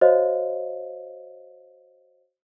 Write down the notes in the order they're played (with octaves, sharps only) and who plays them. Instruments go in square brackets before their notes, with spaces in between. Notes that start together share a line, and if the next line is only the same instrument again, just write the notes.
[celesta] F#4 C5 C#5 D#5 F5